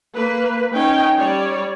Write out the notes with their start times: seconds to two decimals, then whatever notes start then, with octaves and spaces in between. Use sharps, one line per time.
0.15 A#3 B4
0.72 C#4 D#4 G5
1.18 G3 C#5 D5